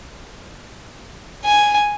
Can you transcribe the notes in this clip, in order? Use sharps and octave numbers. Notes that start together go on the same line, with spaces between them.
G#5